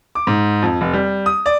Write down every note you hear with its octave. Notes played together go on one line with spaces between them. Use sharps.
D6
G#2
F2
F1
G3
D#6
D5